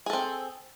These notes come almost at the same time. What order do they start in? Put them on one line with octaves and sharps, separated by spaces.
G#4 A4 C4